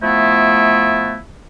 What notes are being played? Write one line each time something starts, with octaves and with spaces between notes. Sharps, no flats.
F3 A3 B3 E4